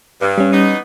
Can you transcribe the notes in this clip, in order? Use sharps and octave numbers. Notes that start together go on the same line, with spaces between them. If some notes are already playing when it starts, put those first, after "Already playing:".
G2
G3 C#4
E3 B3 D#4